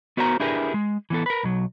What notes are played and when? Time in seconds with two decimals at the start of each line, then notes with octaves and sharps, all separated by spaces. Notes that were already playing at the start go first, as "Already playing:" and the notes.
0.17 B3 F#4 A#4 C5 D#5 A#5
0.40 D4 E4 G4 G#4 A#4 B4
0.74 G#3
1.10 E3 B3 A4
1.26 A#4 B4
1.43 B1 F#3